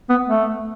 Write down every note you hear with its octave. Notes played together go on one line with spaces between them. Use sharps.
B3
A3